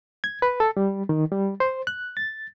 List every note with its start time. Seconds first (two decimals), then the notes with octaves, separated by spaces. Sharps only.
0.24 G#6
0.42 B4
0.60 A4
0.77 G3
1.09 D#3
1.32 G3
1.60 C5
1.87 F#6
2.17 A6